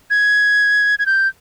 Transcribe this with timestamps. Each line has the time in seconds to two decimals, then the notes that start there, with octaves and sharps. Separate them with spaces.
0.10 G#6
0.99 G#6
1.06 G6